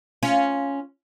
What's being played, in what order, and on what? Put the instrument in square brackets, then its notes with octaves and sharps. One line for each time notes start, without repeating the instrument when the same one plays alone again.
[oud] C#4 F4